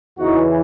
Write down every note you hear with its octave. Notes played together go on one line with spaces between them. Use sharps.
E2 C#3 E3 D#4 F#4